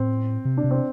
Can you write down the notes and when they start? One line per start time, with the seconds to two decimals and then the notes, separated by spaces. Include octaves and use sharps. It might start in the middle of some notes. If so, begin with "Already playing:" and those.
Already playing: A2 C4
0.45 C3
0.57 D4
0.64 C3
0.71 C4